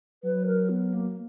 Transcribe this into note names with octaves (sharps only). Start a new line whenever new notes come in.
F#3 B4
A#4
B3
A#3